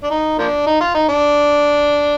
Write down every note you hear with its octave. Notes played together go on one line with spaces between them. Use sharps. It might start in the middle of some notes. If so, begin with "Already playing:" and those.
D4
D#4
F3 A#3 D4
D#4
F4
D#4
D4